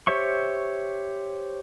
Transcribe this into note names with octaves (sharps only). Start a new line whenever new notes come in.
G4 C5 C#5 E5 C#6